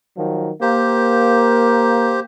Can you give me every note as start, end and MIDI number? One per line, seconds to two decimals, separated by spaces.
0.18 0.50 51
0.18 0.50 53
0.18 0.50 54
0.61 2.25 58
0.61 2.20 67
0.61 2.20 72